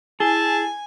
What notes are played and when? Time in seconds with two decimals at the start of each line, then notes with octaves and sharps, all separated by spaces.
0.20 E4 G#4 G#5 A5